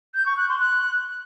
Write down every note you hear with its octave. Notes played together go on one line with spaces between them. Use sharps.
G6
C#6
F#6
C6
F#6